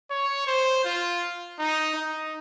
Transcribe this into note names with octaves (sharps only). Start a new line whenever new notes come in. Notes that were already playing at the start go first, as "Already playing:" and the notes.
C#5
C5
F4
D#4
D#4